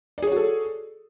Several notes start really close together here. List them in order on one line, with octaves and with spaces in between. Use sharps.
D5 G#4 C#5 F#4 A4